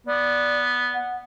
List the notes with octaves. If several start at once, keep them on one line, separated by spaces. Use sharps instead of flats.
B3 D5
F#5